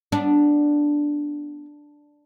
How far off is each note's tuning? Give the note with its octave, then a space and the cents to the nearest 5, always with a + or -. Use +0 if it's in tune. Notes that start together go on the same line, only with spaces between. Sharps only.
B3 +0 D4 +0